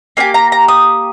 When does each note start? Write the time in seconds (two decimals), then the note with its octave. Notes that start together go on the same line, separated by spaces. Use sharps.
0.17 A#3 D4 G4 G#5
0.34 A#5
0.52 A#5
0.68 D#6